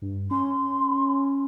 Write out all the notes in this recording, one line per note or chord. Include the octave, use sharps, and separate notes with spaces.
G2
C#4 C6